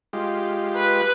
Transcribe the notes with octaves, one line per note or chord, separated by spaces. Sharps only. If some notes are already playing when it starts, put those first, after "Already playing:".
G#3 F4 G4
B4